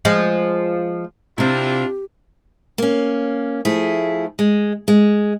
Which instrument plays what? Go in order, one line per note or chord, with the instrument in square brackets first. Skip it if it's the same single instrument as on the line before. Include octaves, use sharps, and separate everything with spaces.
[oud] F3 G#3
[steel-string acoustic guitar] C3 C4 [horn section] D4 E4 F4 [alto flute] G4
[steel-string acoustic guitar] A#3 C#4
F3 A3 E4 G#4
G#3
G#3